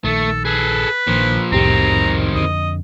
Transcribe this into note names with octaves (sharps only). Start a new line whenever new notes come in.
A#1 D#3 A3 A4
G#4 A4 B4
A#1 A#2 D#3 F3
C2 F2 A2 D#3 C4 G4 A#5
F2 D3 D#5